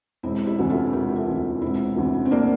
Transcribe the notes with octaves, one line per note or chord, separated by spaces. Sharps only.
E1 C4 E4
E4 G4
D2 C3 E3
F4 A4
E1 G4 A#4
F4 A4
D2 C3 E3
E1 C4 E4
D2 C3 E3
C4
A#3 D4